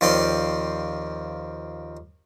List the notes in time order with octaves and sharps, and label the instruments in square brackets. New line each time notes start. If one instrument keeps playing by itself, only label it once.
[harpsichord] D#2 F3 C4 D5 C6